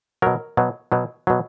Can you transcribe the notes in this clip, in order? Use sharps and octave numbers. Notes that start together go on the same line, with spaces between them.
B2 F#3 A#4
B2 F#3
B2 F#3
B2 F#3